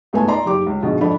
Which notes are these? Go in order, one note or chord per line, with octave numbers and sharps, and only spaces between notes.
C#2 G#2 A3 B3 B4 G#5
D5 A#5 C6
F#1 D#3 G4 D6
C#2
A#1 G#2 B2 D3 G#3
F2 G#2 D4 A4 D5 B5